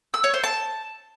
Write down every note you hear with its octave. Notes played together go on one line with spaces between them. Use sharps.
E6
C#5
C5
A5